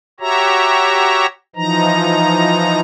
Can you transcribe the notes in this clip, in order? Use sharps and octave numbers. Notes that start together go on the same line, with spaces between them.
F#4 G4 C#5 E5 A#5
E3 F3 D#4 A#5